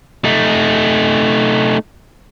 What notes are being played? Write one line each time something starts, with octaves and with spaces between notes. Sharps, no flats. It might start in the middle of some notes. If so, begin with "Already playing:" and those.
A3 D#4